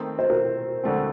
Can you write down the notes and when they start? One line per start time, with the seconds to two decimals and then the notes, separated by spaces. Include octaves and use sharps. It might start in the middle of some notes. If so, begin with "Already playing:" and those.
Already playing: D#3 A3 C4
0.19 C5
0.30 A#4
0.84 D2 D3 A3 C4